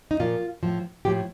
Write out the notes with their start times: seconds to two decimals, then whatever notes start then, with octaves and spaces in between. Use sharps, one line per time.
0.11 D#4
0.19 A#2 F3 F4
0.63 A2 F3
1.05 A2 F3 G4